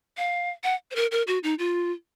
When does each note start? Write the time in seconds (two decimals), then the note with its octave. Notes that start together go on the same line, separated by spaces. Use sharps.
0.17 F5
0.64 F#5
0.91 C5
0.96 A#4
1.12 A#4
1.27 F#4
1.43 D#4
1.59 F4